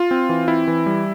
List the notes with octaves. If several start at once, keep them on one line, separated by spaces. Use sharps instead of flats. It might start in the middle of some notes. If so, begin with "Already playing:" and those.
Already playing: F4
C4
E3
C4 E4
E3
G3